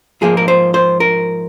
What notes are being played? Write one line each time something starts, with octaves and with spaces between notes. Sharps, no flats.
G#2 F3 A#3 G#4
A#4
C5
C5
A#4